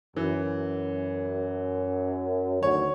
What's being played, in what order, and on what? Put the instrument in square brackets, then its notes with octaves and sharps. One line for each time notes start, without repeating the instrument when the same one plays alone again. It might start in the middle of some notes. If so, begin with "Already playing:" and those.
[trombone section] F#2 [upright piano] E3
[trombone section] D2 D#3 F#3 [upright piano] C#5